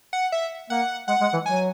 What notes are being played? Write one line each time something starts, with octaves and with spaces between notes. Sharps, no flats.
F#5
E5
A#3 F#5
G#3 F#5
G#3
E3
F#3 G#5